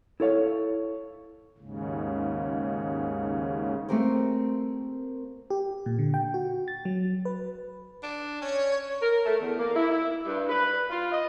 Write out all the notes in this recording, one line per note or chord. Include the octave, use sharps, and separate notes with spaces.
E4 A4 C#5 F5
D#2 G#2 C#3
A3 A#3 C4 G4 A#4 C5
G4
A#2
D3
G5
F#4
A6
F#3
B4
D4
C#4 C#5
A#4
A3
E2
A#3
E4
E4
G2
B4
F4
D#5